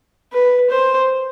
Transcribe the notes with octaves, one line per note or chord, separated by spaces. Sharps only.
B4
C5